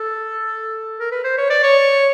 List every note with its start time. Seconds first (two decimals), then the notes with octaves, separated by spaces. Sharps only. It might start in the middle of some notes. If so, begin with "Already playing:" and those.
Already playing: A4
1.00 A#4
1.12 B4
1.24 C5
1.38 C#5
1.50 D5
1.63 C#5